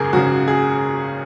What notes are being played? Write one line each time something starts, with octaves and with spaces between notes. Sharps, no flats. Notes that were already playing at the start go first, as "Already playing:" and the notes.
Already playing: G#1 F#2 C#3 G#4 A#4
G#1 F#2 C#3 F#4
G#4